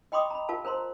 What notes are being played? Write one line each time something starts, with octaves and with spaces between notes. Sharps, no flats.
D#5 G5 B5 C6 D6 D#6
A#5 B5
F4 A#4 F5 A5
A#4 C5 A#5 C6